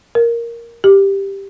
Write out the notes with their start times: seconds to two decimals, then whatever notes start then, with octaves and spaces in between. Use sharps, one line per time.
0.15 A#4
0.84 G4